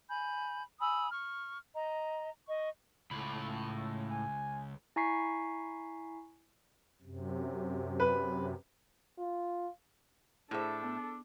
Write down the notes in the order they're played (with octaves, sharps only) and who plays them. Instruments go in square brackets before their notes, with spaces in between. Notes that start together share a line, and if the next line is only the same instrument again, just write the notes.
[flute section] G#5 B5 G6
G#5 B5 D#6 E6
C#6 F6
D#5 A#5
D#5 C#6
[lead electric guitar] C#2 [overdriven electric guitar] A2 B5
[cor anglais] G#5
[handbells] E4 G#5 A#5 C#6 B6 C7
[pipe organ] F#2 C3
[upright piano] B4
[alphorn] F4
[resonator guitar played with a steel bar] A2 E5 [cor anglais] D4 [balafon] E4 G#4 C5 [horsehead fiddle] A4
[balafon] B3